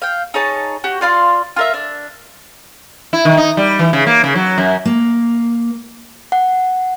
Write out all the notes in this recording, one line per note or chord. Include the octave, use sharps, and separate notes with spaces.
F5 G5
D#4 G#4 C#5 A5
F#4 G4
F4 D5 F5 C6
F4 A#4 E5
D4
E4
D#3
D#4
G3
E3
C#3
A#3
C#3
F#3
F#2
A#3
F#5